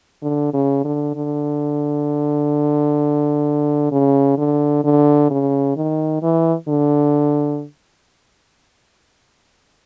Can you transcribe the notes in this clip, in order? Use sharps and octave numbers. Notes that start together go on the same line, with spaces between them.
D3
C#3
D3
D3
C#3
D3
D3
C#3
D#3
E3
D3